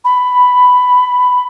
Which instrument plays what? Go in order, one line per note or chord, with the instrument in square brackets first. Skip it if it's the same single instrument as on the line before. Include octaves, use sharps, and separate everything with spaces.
[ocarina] B5